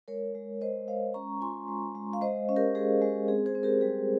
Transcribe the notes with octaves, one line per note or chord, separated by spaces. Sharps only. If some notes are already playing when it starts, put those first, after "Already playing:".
G#3 A#4 C#5
G#3
G#3 C5 D#5
G#3 C#5 F5
C#4 A#5 C#6
F4 G#5 C6
G#3
G#3
F5
G#3 C5 D#5
C#4
G4 A#4
G#3 G#4
G#3
C4 G#4
G#4 C5
C4
G4 A#4
G3 G#4